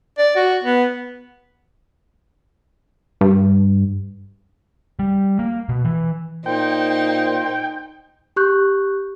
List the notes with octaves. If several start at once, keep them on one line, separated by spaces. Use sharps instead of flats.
D5
F#4
B3
G2
G3
A#3
B2
E3
A#2 D#4 C5 G5
G4 C#6 F#6 G6